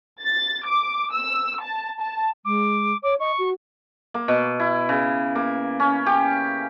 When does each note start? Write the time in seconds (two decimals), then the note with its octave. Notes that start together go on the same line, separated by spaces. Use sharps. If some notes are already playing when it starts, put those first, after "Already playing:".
0.22 A6
0.66 D6
1.12 E6
1.62 A5
2.00 A5
2.45 G#3 D6
3.03 C#5 D6
3.20 D#5 C#6
3.39 F#4
4.14 A#3
4.28 B2
4.60 E4
4.89 C#3
5.35 A#3
5.80 C#4
6.06 G4